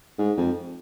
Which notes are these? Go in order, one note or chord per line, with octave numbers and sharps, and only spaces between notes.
G#2
F2